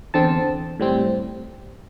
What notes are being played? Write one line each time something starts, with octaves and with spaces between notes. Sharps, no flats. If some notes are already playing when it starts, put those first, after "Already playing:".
E2 D3 C4 A5
A2 G3 C4